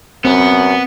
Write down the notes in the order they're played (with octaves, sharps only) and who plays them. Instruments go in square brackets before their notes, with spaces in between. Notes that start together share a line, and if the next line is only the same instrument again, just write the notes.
[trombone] F#2 [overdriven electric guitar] B3 [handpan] C4